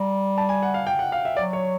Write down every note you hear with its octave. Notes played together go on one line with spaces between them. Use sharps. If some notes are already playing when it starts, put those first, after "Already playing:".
Already playing: G3 A#5
A5
G#5
F#5
F5
G5
F#5
F5
E5
F#3 D5
C#5